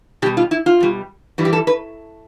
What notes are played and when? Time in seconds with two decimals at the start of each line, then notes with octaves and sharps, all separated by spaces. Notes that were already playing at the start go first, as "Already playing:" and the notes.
0.22 B2 G4
0.26 G3
0.37 F4
0.51 E4
0.66 F4
0.80 B2 G3
1.38 G2 E3 G3
1.45 G4
1.53 A4
1.67 B4